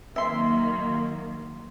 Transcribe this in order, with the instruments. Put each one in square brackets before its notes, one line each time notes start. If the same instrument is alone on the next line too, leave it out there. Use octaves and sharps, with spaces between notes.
[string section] D#3 F#3 A#3 [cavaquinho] E5 C6